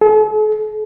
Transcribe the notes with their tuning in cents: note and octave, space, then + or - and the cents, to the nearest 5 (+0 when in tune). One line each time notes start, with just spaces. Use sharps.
A4 -45